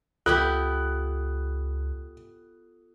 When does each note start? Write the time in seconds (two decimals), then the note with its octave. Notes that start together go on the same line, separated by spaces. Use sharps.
0.26 C#2 B3 E4 F4 G4 A4 D#6 F#6